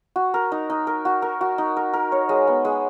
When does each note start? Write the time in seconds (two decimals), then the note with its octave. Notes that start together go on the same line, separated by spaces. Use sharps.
0.16 F#4
0.34 A#4
0.52 D#4
0.70 D#4
0.87 A#4
1.05 F#4
1.22 A#4
1.41 F#4
1.58 D#4
1.77 A#4
1.94 A#4
2.12 C#5
2.29 G#3
2.47 B3
2.65 G#3